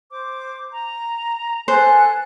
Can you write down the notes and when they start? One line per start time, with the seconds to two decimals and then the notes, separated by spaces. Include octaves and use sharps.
0.11 C5 D6
0.73 A#5
1.68 A4 B4 C5 G#5 F#6